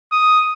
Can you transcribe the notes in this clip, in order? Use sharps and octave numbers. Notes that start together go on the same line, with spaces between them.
D#6